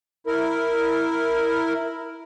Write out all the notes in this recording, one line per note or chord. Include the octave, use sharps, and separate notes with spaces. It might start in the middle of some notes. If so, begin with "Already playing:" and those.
E4 A#4